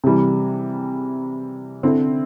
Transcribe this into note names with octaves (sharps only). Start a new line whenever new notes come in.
C3 E3 G3
D3 C4 E4